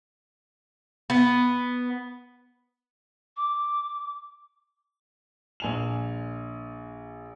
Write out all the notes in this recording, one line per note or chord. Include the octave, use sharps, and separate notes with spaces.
B3
D6
A#1 G#5 F7